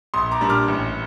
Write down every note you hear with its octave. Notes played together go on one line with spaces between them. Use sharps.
A#1 C6 D#6
A#5 D6
A#2 G3 D4
D6 F6
A1